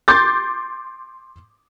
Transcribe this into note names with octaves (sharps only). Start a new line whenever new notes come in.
C6 D6 G6 A6